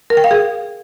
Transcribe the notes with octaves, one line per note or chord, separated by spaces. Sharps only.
A#4
G5
F5
G#4